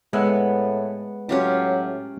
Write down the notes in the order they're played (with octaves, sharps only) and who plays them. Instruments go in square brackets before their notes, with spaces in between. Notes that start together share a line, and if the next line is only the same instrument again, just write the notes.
[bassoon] A2 [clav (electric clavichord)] G#3 E5 F#5 [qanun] B3
[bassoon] A2 [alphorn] F#3 [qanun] C#4 F4 G4